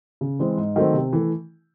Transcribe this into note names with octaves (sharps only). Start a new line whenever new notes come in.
C#3
E3 G#3 C4
G#2
D#3 F#3 A3 C4
C3
E3 A3